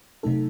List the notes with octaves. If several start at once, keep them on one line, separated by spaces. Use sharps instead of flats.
C3 F#3 A3 D#4 A4